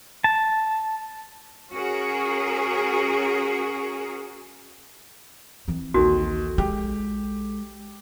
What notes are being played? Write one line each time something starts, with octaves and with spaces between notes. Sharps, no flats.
A5
C#4 F#4 G#4 A#4
E3 C4
A#1 D#2 F#4 A4
G#3 G4